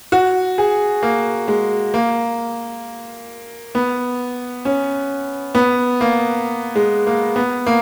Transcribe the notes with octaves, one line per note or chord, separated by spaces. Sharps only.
F#4
G#4
A#3
G#3
A#3
B3
C#4
B3
A#3
G#3
A#3
B3
A#3